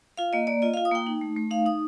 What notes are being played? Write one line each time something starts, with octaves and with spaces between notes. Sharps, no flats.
F4 F5
A#3 D#5
A#3 D5
F4 D#5
F5
F4
D#6
A#3 G5
D#4
A3
A3
D#4 F5
D#4 D#6